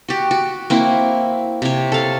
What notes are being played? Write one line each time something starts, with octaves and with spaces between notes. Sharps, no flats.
F#4 G4
F#4
A#3 C4 E4
C3 C#5
A4 F5